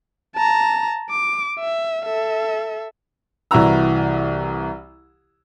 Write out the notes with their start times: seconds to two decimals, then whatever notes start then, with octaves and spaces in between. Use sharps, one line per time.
0.36 A5 A#5
1.10 D6
1.60 E5
2.06 A4 E5
3.51 C2 E3 E4 F#4 A#5 E6